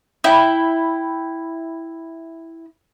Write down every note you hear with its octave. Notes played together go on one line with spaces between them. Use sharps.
E4 G5